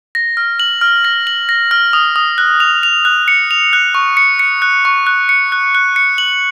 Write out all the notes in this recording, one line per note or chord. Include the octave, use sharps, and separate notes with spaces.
A#6
F6
F#7
F6
A#6
F#7
A#6
F6
D#6
D#6
F#6
F7
F7
F#6
C#7
F7
F#6
C#6
C#7
C#7
F#6
C#6
F#6
C#7
F#6
F#6
C#7
F#7